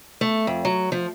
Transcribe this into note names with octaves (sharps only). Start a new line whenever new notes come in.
A3
F2
F#3
F3